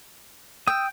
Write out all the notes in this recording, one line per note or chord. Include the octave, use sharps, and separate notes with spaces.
G5 D#6 E6